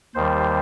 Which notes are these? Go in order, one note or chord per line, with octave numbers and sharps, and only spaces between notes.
D#2 D#3 G3 C5